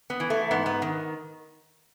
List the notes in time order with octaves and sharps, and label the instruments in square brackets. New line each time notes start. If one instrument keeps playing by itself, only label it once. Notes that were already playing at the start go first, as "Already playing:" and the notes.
[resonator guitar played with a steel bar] B3
E3
A3
G#2 B3
B3
D#3